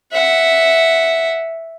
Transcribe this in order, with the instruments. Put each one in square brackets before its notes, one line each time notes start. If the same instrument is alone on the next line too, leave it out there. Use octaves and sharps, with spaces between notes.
[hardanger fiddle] E5 F#5